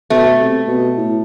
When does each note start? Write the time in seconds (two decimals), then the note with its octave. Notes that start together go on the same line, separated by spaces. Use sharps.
0.10 B2 A3
0.40 C3
0.68 B2
0.97 A2